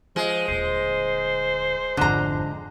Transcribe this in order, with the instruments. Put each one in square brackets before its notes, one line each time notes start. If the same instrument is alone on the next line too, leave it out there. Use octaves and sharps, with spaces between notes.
[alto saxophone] F3 [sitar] G#3
[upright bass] D#1 D3 [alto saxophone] C5
[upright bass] G#1 F2 [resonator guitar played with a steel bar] D3 A#5